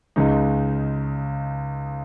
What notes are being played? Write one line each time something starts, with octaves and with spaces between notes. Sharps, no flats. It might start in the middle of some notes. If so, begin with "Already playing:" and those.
C#2 C#3 G#3 D#4